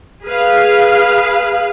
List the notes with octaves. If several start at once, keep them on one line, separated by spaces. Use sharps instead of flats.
G#4 B4 F5